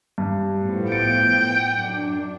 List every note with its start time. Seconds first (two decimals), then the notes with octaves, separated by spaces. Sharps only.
0.18 G2
0.59 A2 F3 B3
0.92 G5 A6 C#7 D7
1.76 F#2 D4